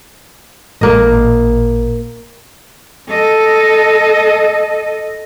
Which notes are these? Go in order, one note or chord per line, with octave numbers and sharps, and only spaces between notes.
A1 A#2 A#3 D#5
A4 D#5